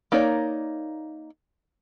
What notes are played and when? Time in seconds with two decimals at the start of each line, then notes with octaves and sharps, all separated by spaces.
0.12 A#3 D#4 A#4 C#5 D5